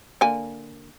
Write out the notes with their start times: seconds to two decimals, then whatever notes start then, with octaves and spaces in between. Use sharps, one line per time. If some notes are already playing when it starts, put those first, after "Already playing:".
0.21 D3 A#3 G#5